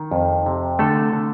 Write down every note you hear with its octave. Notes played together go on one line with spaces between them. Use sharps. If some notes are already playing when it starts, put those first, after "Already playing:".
Already playing: D#3
F2
C3
D3 A3 A4
D3